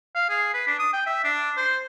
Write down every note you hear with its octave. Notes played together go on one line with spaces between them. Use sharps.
F5
G#4
B4
D4
D#6
G5
E5
D4
C5